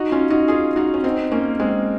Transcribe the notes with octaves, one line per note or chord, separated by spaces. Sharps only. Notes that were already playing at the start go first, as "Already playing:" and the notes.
Already playing: D#4 F#4
C#4 F4
D#4 F#4
F4 G#4
D#4 F#4
C#4
C4 D#4
A#3 C#4
G#3 C4